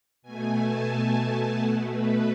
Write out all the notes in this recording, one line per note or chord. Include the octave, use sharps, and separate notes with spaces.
B2 A3 G#5
A5
G#5
G#5
B2 A3 F#5
B4